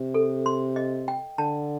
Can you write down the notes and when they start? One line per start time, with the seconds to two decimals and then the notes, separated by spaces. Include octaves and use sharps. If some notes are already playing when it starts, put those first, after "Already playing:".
Already playing: C3
0.14 A4
0.46 C6
0.76 D#5
1.08 G5
1.38 D3 A5